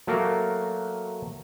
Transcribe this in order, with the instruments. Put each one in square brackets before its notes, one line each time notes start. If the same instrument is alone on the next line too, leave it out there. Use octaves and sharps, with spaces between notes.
[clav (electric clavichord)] F#3 A3 A#3 F#4 A#4